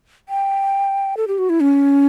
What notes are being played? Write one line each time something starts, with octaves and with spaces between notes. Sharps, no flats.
G5
A4
G4
F#4
E4
C#4